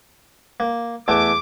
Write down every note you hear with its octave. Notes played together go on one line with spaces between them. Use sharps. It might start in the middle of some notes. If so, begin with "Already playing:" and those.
A#3
E2 A3 D6